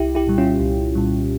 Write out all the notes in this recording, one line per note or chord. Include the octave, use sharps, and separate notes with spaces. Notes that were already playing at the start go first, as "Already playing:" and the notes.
Already playing: C2 E4 G4
E4 G4
A#2 G3
C#4 F4
C2
A#2 G3